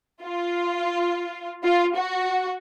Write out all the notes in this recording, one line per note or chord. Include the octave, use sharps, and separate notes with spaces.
F4
F4
F#4